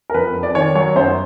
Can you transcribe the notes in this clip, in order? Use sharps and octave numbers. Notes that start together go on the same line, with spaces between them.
A#4
F2 B4
F2
D5
D#3 C#5
F#3 C#5
F#2 C5